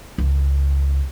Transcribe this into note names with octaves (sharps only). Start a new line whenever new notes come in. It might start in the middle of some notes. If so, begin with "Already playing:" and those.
C#2